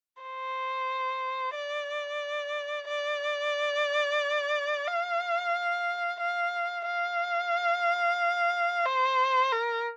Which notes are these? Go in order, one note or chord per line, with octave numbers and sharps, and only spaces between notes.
C5
D5
D5
F5
F5
F5
C5
A#4